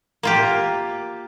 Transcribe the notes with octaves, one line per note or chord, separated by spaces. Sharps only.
A#3 F4 G4